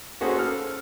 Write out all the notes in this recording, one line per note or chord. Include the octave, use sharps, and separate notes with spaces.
A#3 C#4 F#4 G#4 A4 C5
A4 F6